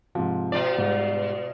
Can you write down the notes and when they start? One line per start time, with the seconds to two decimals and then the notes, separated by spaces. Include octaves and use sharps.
0.15 G#2 C3 F3
0.52 B2 F4 D5
0.77 G#2 G3